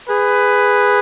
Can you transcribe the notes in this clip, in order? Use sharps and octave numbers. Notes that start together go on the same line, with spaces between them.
G#4 B4